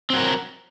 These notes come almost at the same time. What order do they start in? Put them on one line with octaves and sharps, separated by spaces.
C4 F#3 A#4